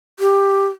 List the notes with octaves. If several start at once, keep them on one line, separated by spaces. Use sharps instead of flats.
G4